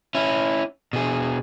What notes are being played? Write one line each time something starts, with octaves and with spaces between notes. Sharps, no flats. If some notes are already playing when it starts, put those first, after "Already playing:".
C#4 E4
B2 G#4